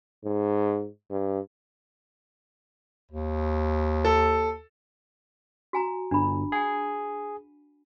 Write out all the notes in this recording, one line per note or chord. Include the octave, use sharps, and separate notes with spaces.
G#2
G2
D#2
A4
F#4 G#5 A#5
G1 D4 B5
G#4 F#5 G#5